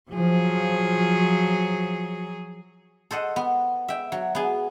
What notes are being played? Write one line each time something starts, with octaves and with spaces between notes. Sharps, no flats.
F3 F#3 G#4
A4 C5 D#5 F#5
B3
E5 G5
F#3
B3 G#4